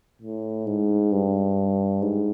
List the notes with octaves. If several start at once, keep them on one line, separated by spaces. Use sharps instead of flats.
A2
G#2
G2
G#2